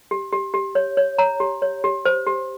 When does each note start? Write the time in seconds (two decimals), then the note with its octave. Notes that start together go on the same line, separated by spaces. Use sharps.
0.11 G4
0.33 G4
0.54 G4
0.75 C#5
0.97 C#5
1.18 C#5 A#5
1.40 G4
1.62 C#5
1.84 G4
2.05 C5
2.27 G4